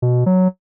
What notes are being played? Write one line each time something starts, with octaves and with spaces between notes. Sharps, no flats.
B2
F#3